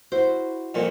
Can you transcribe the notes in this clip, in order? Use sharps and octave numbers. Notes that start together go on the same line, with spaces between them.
E4 F#4 C5
F2 A#2